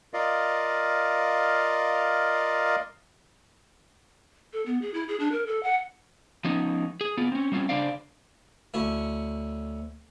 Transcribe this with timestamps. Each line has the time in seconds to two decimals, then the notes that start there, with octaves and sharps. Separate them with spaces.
0.14 F4 A#4 D5 D#5 F5
4.53 A4
4.66 B3
4.82 G#4
4.94 E4
5.08 G#4
5.20 D4
5.32 A#4
5.47 A4
5.63 F#5
6.45 F3 B3 C#4 D#4
7.01 G#4
7.17 B3 F4
7.32 C4 C#4
7.52 G3 C4 C#4 F4
7.69 C#3 D4 C5 D5 F5
8.74 D2 C#4 E4